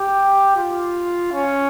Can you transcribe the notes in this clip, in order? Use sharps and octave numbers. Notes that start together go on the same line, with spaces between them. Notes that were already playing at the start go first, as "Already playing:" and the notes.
Already playing: G4
F4
C#4